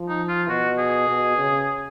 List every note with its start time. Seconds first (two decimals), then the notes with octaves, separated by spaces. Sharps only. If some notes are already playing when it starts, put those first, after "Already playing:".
Already playing: F3
0.09 D#4
0.29 F4
0.49 B2 F#4
0.78 G#4
1.08 B2
1.38 C#3